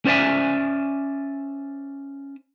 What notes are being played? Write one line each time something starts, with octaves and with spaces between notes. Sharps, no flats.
C#4 C5 D5 E5 G#5